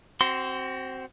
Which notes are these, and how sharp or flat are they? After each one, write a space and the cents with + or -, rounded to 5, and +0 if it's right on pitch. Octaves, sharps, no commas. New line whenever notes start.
C4 +0 F#4 +30 C6 -15